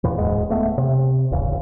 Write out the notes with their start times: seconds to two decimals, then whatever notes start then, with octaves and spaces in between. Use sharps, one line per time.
0.04 E2 A#2 E3
0.17 D1 G#2 G#3
0.50 D1 A3 B3
0.78 C3
1.31 D1 G#1 E2 C#3